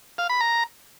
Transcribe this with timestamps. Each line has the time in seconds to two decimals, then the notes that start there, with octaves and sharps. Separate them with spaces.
0.18 F5
0.30 B5
0.41 A#5